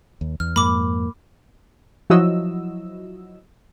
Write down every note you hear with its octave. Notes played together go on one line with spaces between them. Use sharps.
D#2
E2 F6
F2 G#2 A#3 B5 D6
F3 F#3 E4 F#4 D#5 E6